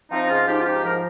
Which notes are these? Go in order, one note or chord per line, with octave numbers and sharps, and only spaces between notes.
F3 C4 D#4
G#2 C#4 F4
F3 D#4 G4
F4
G#2 D#4 G4
F3 A#4